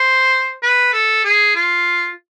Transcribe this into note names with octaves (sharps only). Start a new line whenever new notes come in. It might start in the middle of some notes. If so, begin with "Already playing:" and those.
Already playing: C5
B4
A4
G#4
F4